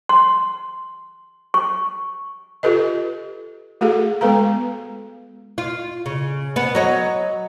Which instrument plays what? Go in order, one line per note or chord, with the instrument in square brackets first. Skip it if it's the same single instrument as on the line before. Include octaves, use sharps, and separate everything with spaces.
[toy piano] C6
C#6
[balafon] F4 G4 A4 B4 D#5
A3 F#4 G#4 A4 F5
G#3 B3 A4 B4 F5 A#5
[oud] F4
C#3
B3
F#3 C#5 D#5